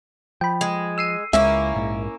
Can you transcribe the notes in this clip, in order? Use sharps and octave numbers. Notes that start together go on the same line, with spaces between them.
F3 G5 B5
G#3
E6 C7 D#7
C#2 G#3 A#3 C#4 E4 E5
A#1 G#2